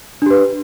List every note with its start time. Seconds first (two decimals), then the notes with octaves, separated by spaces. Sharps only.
0.22 D4
0.26 G4
0.31 B4